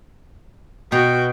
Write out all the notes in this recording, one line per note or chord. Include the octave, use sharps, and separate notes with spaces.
B2 F#4 G5